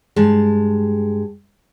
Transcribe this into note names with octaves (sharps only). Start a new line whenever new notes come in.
G2 G#3 A5